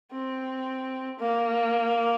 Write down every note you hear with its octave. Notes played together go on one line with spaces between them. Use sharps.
C4
A#3